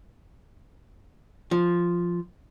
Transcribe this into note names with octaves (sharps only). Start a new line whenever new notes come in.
F3